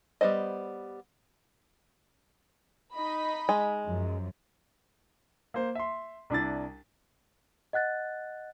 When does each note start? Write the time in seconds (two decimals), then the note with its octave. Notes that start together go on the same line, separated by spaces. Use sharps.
0.21 G3 B3 C5 D#5
2.95 D#4 D#5 B5
3.49 G#3
3.85 F#2 F3
5.54 A#3 C5
5.75 E5 C6
6.30 C2 D4 E4 A6
7.73 D#5 F#5 F#6 A6